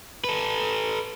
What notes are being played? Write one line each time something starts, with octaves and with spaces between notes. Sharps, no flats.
A4 B4